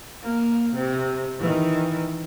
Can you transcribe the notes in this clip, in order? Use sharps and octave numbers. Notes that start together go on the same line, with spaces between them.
A#3
C3
D#3 E3